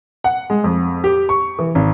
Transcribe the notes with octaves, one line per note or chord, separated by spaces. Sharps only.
F#5
G#3
F2
G4
C#6
E3
G#1